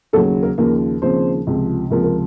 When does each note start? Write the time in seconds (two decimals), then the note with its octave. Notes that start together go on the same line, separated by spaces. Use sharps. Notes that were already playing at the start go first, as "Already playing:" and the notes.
0.13 D#2 C#3 F#3 A3 A4
0.43 A#3 A#4
0.58 D#2 C#3 F3 A#3 A#4
1.02 D#2 C#3 F3 C4 C5
1.47 C#2 C3 F3
1.91 C#2 C3 F3 A#3 A#4
2.04 A#4